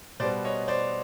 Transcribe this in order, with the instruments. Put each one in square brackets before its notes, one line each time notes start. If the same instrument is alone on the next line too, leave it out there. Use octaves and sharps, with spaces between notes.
[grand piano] B2 G3 B3 C5 D5
C#5 D#5
C5 D5